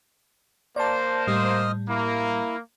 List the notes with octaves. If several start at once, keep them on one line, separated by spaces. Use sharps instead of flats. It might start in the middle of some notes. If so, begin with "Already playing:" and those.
A#3 C5 D5 A5
A2 G3 D#5 D#6 F6
A#3 E4